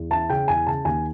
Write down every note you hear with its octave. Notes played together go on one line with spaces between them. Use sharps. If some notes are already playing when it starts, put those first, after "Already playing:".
Already playing: E2
E3 A5
C#3 G5
E2 G#5
C#3 A5
D#2 G#5